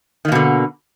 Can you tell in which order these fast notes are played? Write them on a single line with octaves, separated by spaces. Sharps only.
D#3 A#3 B2 D3